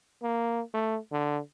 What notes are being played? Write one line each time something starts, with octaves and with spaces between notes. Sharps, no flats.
A#3
A3
D3